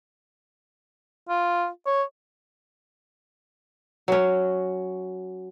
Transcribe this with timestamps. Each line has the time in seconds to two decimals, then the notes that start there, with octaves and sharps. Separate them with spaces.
1.29 F4
1.86 C#5
4.08 F#3 C#4